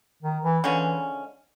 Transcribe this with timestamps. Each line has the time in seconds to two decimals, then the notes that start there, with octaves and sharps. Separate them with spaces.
0.23 D#3
0.44 E3
0.64 D3 E3 F3 G#3 C#4